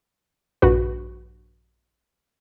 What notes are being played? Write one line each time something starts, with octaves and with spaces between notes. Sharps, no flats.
A#1 G2 F#4 B4